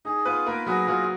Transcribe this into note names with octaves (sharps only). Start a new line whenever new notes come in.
D#4 G#4
B3 F4 B4
A#3 A#4 B4
F#3 F#4 G#4
F#3 F4 F#4